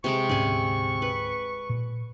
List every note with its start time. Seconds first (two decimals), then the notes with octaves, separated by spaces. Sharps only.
0.04 C3 G#3 C#6 D6
0.30 D2 G#2 C#4 D5 G#5
1.02 B4
1.70 A#2